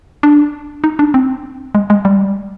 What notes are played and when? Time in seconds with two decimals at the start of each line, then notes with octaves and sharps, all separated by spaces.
0.23 D4
0.84 D#4
0.99 D4
1.14 C4
1.75 G#3
1.90 G#3
2.05 G3